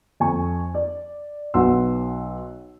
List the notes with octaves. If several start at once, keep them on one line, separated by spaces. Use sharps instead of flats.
F2 G#5 C#6
D5
B1 F#3 B3 F#5 C6 E6